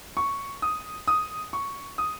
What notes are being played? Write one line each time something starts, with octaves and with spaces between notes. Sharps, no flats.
C#6
D#6
D#6
C#6
D#6